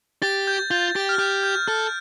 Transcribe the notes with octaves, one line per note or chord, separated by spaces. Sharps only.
G4 A6
G6
F4 G6
G4 A6
F6
G4 G6
G6
A4 F6